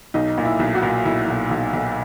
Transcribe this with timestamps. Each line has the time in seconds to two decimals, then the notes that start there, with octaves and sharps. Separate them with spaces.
0.14 B1 D#4
0.38 A#2
0.45 E4
0.59 B1
0.75 F#4
0.83 A#2
1.05 B1 E4
1.28 B1
1.51 B1
1.73 B1